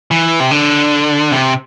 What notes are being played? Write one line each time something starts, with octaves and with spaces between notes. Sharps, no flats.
E3
C3
D3
C3